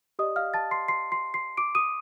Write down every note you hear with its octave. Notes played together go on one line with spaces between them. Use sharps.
G4 D5 D#5 D#6
F5 F6
A5 A6
C6 C7
C6 C7
C6 C7
C6 C7
D6 D7
D#6 D#7